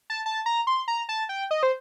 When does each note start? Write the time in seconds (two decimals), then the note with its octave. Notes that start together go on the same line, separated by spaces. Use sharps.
0.10 A5
0.26 A5
0.46 A#5
0.67 C6
0.88 A#5
1.09 A5
1.29 G5
1.51 D#5
1.63 C5